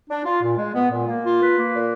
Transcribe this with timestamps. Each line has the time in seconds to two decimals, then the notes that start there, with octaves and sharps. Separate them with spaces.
0.09 D4
0.25 F4
0.42 A#2
0.58 G#3
0.74 B3
0.91 A#2
1.07 A#3
1.23 F4
1.41 B4
1.57 A#3
1.74 A#2